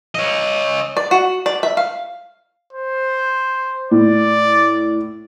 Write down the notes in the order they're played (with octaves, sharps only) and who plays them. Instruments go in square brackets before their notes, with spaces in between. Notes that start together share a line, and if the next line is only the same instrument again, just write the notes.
[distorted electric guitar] C#5 D#5
[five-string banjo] D5
F#4
D5
E5
F5
[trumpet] C5
[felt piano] A2 [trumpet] D5